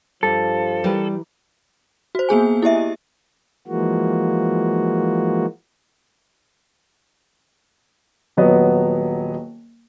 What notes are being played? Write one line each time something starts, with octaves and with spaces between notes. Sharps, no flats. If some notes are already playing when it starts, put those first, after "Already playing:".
G2 F3 G3 A4
E3 G3 A#4 B4
F#4 C5
A#3 B3 G#4 G#5
E4 G4 D#5 E5
E3 F3 G#3 A#3 F#4
D#1 F#3 B3 D#5